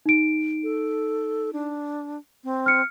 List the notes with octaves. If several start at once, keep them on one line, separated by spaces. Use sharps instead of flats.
D#4 D7
A4
D4
C4
F6 C#7